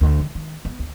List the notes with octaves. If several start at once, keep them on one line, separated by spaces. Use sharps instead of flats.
D2
D#3
D#3
B3
D2